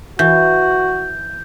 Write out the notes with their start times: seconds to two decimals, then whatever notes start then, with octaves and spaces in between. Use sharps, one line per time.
0.19 E3 F#4 G6